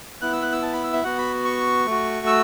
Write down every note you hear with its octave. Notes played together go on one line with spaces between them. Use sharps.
B3 E4 F#6
E6
F#6
E6
A5
B5
E6
E5
B3 F#4 F#5
B5
C#6
A3 F#4
E6